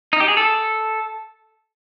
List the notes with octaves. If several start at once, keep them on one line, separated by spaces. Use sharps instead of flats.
D#4
G4
G#4
A4